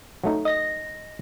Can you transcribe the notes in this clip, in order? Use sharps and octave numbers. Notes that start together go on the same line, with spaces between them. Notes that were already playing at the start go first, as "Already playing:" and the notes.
F#3 A3 D#4
D#5 A#6